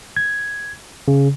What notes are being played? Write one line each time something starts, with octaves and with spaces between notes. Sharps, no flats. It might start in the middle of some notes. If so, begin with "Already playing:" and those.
G#6
C#3